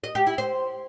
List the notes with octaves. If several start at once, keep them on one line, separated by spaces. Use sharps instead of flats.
D#5
G4
E4
C5